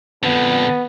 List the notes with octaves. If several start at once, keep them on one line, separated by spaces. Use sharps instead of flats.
F2 D3 B3